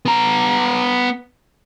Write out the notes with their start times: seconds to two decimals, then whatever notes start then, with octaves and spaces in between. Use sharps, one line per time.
0.05 B3 A#5